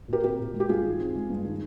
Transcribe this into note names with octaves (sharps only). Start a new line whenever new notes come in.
A#2 G4 A#4
C4 G4 A#4
A#2
G#3
G4
G2 F4 G#4
D#3
C4
G#3
G2
D#3